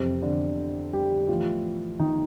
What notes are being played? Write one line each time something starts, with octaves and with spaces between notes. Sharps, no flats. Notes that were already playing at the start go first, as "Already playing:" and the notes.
Already playing: F2 C3 E3 C4
D3 D4
G3 G4
A2 E3 F3 F4
D#3 D#4